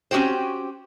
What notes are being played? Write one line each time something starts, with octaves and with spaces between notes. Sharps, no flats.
C4 C#4 E4 F#4 G4 C5